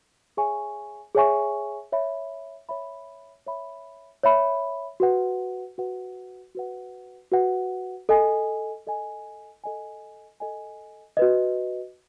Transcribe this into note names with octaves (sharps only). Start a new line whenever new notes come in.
G#4 C#5 E5 G#5 C#6
G#4 C#5 E5 G#5 C#6
C#5 E5 B5
C#5 E5 B5
C#5 E5 B5
C#5 E5 B5
F#4 B4 F#5
F#4 B4 F#5
F#4 B4 F#5
F#4 B4 F#5
A4 D#5 G#5
A4 D#5 G#5
A4 D#5 G#5
A4 D#5 G#5
F#4 B4 D#5